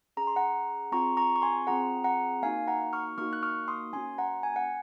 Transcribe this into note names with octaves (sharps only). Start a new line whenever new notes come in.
C#4 G#4 A#5
C6
F#5 A#5
C4 F4 G#4 A#5 C#6
A#5 C#6
C#6
G#5 C6
C4 F4 G#4 F#5 A#5
F#5 A#5
A#3 D#4 F#4 F5 G#5
F#5 A#5
C#6 F6
A#3 D#4 F#4 C#6 F6
F#6
C#6 F6
C6 D#6
A#3 C#4 F#4 G#5 C6
F#5 A#5
G#5
F#5